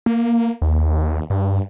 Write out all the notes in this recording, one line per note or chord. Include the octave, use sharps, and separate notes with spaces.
A#3
D#2
G2